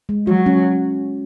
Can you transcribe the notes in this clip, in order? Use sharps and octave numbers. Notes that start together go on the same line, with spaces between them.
G#3
F#3 F#4
C#4